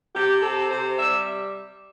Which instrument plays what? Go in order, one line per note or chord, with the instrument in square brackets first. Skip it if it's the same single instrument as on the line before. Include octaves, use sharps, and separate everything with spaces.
[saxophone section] C3 G4
C4 A4
C3 C5
G3 E5